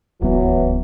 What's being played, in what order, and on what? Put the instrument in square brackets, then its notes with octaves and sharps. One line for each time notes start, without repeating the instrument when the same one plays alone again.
[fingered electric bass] D1 C#2 B3 [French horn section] E3 F#3